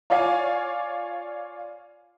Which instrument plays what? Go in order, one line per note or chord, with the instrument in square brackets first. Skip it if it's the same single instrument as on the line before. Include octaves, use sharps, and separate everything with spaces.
[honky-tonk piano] F4 C#5 D5 F5 G#5